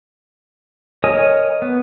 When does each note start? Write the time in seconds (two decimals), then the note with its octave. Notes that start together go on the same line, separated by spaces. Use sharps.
1.04 A#4 C#5 D#5 G#5 D#6
1.62 B3